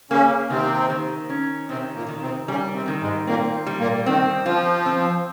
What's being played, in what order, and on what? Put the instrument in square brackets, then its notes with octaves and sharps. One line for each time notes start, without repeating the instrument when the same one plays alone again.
[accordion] C#3 C#4 [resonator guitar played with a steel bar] A#3
[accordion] C3 C4 [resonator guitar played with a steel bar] D#3
[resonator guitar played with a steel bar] D#3
C#4
[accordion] C3 C4 [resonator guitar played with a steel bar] D#3
[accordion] A#2 A#3
[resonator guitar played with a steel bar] D#3
[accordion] C3 C4
[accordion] C#3 C#4 [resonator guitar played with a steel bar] G3
[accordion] C3 C4
[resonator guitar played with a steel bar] D#3
[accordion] G#2 G#3
[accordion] A#2 A#3 [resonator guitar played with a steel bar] C4
[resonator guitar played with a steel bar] G3
[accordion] A#2 A#3
[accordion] D#3 [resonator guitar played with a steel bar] C4
[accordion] F3 [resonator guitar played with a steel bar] F4
[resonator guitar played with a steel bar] C4